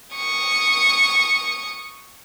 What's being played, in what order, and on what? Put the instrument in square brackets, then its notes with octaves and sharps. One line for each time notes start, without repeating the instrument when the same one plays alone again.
[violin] C#6 D#6